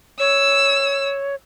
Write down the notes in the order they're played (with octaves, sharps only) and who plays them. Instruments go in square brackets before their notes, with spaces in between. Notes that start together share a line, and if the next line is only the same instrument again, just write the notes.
[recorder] C#5 [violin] E6